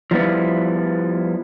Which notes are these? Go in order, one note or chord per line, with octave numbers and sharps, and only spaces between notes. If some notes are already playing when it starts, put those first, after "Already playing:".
F3 G3 B3 E4